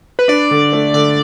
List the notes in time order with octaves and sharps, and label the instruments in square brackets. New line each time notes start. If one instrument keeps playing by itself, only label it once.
[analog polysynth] B4
[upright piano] D4 [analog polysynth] D5
[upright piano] D3
A3
[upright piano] D3 [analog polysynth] D5